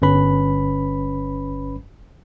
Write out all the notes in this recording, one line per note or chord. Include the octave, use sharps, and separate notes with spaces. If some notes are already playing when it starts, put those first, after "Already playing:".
G1 C#4 B4 B5